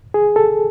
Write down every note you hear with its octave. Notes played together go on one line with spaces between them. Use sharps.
G#4
A4